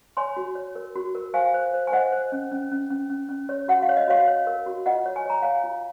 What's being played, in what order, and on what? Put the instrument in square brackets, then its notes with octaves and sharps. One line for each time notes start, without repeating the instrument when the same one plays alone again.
[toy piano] C#5 G#5 C6
F#4
C#5
A#4
F#4
A#4
C5 F5 G#5
C5
C5
G#5
C5 D#5 F#5
C5
C#4
C#4
C#4
C#4
C#4
C#4
C#5
F#4 F#5
F5
C#5
D#5
F#4 C#5 F5
C#5
A#4
F#4
F4 D#5 F#5
C#5
G#5
C#5 A#5
C#5 F5 G#5
F4